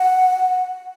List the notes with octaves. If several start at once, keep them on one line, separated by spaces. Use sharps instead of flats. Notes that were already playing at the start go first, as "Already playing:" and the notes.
Already playing: F#5